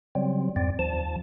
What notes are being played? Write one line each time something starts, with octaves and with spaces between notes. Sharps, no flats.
C#3 F#3 G3 C4
F2 G#2 C4 D5
D#2 F3 A5